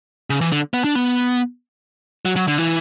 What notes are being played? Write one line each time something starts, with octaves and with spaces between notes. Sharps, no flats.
C#3
E3
D3
B3
D4
B3
F#3
F#3
D3
E3